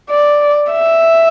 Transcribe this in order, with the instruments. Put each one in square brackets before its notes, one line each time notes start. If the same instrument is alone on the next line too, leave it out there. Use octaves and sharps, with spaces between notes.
[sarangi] D5
E5